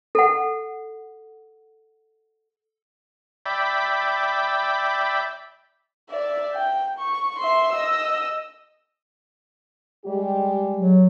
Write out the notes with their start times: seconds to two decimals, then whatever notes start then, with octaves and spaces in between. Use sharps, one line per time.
0.15 A4 F#5
3.46 D5 E5 G5 B5
6.10 D5 E5
6.54 G5
6.99 C#6
7.39 E5 C6
7.72 D#5 E6
10.06 G3 G#3 G4
10.77 F#3